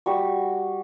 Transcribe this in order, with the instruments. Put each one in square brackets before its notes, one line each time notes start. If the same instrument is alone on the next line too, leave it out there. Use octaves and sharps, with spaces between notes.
[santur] G3 F#4 C#6